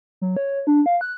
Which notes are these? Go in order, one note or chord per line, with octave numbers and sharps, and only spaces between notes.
F#3
C#5
D4
F5
F#6